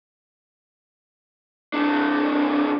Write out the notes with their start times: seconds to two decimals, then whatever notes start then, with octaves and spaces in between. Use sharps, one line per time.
1.74 C2 D4